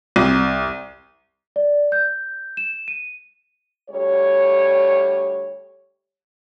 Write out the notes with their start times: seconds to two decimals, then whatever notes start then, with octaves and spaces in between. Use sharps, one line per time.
0.16 C2
1.56 D5
1.92 G6
2.57 E7
2.88 D#7
3.90 D2 G3 C#5